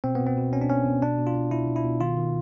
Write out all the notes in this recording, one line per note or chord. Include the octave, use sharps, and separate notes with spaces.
B2 C4
B3
B2
C4
B2
B2 C#4
D4
B2 C#4
B2
B2 D4
B2
F4
B2
B2 E4
B2
E4
B2
D#3 F4
D#3